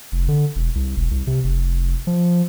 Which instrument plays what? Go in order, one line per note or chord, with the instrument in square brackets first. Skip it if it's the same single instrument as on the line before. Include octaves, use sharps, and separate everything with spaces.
[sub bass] F1
D3
E1
C2
E1
C2
C3
F1
F3